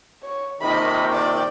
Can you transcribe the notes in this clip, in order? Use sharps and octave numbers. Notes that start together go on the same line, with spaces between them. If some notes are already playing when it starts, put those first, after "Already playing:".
C#5
A#1 C3 D#3 D#5 B5
D5 G5